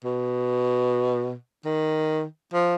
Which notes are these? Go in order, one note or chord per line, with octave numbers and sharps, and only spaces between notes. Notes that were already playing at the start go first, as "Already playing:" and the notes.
B2
D#3
F3